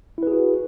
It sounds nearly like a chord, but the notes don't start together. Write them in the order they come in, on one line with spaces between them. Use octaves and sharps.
E4 B4 G#4 F#4